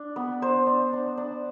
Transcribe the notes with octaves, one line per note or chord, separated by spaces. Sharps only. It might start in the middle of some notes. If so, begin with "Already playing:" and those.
Already playing: D4
B3
D4 C5
D4
D4
D4